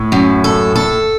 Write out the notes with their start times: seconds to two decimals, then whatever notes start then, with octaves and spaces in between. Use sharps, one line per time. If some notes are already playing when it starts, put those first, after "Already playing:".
Already playing: A2
0.12 F#2
0.44 A4
0.75 A4